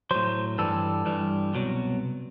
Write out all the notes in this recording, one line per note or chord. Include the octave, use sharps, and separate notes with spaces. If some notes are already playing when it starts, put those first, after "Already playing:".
A2 F#3 C5
G2 E3 G3 A4
G2 E3 G3
C2 B2 F#3